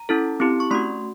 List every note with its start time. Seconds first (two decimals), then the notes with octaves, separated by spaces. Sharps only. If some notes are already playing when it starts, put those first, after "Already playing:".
Already playing: A#5
0.09 C#4 E4 A4
0.40 C4 E4 G4
0.60 C#6
0.71 A3 C#4 F#4 C6